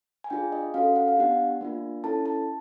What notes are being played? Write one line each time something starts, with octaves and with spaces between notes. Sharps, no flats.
G#5
D4 F4 G#4 G5
D#5
C#4 F#4 A4 F5
F#5
F5
B3 D4 G4 F#5
A#3 D4 F4
C#4 E4 A4 A5
A5